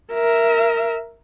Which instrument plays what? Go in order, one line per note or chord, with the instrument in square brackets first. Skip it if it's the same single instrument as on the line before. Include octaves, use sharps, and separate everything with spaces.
[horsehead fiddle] A#4 E5